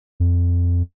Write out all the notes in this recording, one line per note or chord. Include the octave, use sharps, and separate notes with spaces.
F2